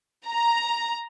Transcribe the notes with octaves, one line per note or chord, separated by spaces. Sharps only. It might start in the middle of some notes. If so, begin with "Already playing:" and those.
A#5